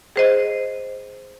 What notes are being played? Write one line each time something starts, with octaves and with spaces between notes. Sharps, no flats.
G#4 C5 D#5